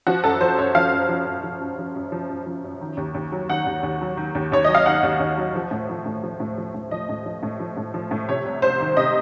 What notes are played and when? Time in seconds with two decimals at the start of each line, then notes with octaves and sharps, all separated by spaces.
0.07 F3 F#4
0.24 F#2 A4
0.41 F3 C5
0.59 F#2 C#5
0.75 F3 F5
0.92 F#2
1.09 F3
1.26 F#2
1.44 F3
1.60 F#2
1.78 F3
1.95 F#2
2.12 F3
2.29 F#2
2.46 F3
2.64 F#2
2.81 D#3
2.97 D#2
3.14 D#2
3.32 F#3
3.49 D#3 F#5
3.66 D#2
3.83 D#2
4.01 F#3
4.17 D#3
4.35 D#2
4.52 D#2 C#5
4.64 F#3 D#5
4.75 F5
4.86 D#3 F#5
5.03 D#2
5.20 D#2
5.38 F#3
5.55 F3
5.71 A2
5.89 F3
6.06 A2
6.23 F3
6.40 A2
6.58 F3
6.74 A2
6.91 F3 D#5
7.09 A2
7.26 F3
7.43 A2
7.60 F3
7.77 A2
7.94 F3
8.11 A2
8.29 C3 C#5
8.46 C2
8.62 C2 C5
8.80 D#3
8.97 C3 D#5